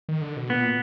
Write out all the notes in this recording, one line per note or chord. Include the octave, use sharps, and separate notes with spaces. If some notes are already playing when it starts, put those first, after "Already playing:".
D#3
D3
B2
A#2 B3